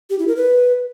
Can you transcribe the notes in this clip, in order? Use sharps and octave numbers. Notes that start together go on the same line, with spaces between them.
G4
E4
A#4
B4